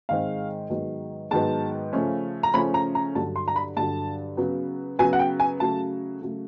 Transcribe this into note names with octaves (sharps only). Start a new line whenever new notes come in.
G#2 D#3 G#3 C4 F5
G#2 D#3 F#3 B3
G#2 D#3 F#3 B3 A5
C#3 F3 A3 C#4
A#5
C#3 F3 A3 C#4 B5
A#5
A#5
G2 D3 F#3 A5
C6
A#5
B5
G2 D3 F#3 A5
C#3 F#3 B3
C#3 F#3 B3 G#5
F#5
G5
G#5
C#3 F#3 A3 A5
C#3 F#3 A3